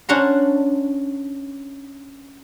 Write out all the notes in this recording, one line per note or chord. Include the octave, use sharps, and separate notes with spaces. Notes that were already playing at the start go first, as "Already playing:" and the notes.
C#4 D4 C5 F#5 A#5 C6